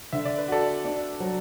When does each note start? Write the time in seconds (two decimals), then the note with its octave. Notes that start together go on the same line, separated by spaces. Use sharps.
0.13 D3 E5
0.25 D5
0.38 B4
0.48 F#4 A4 D5
0.85 D4
1.20 F#3